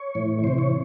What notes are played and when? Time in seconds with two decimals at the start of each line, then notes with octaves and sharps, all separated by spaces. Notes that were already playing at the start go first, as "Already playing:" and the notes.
Already playing: C#5
0.15 A2 E3
0.39 C#5
0.44 C3 E3 C5
0.58 C#5